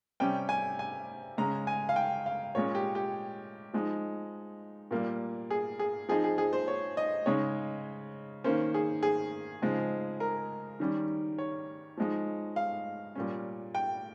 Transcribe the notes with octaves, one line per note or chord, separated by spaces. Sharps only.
C3 G3 C#4 G5
G#5
G#5
C#3 G#3 C#4 A#5
G#5
F5
G5
F5
A#2 G#3 C#4 C#5
G4
G4
F3 G#3 D#4
A#2 G3 A#3
G#4
G#4
F3 C4 D#4 G#4
G#4
G#4
C5
C#5
D#5
C#3 G#3 D#4 C#5
D#3 A#3 C#4 C5
G#4
G#4
C#3 F3 G#3 C4 D#4
A#4
D#3 G3 C#4
C#5
F3 G#3 D#4
F5
A#2 G3 C#4
G5